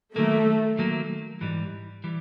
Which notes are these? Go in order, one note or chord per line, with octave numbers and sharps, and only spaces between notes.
D#3 F#3 A3 A#3
D#3 F#3 A#3
G#2 E3 G3
E3 G3